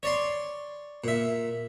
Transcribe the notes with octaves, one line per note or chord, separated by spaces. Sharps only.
C#5 D5 C6
A#2 E5